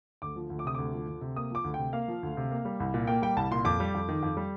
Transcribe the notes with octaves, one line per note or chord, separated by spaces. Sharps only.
D2 D6
F3
D2
D6
C3 D#6
D2 D6
F3
D2
C3
A#3 D#6
F3 D6
D2
C3 G5
A#3 F5
F3
D2
C3
A#3
G3
C2
A#2
A#3 G5
G3 G5
C2 A5
A#2 C6
F2 D6
G3
F2
D#3
F2
G3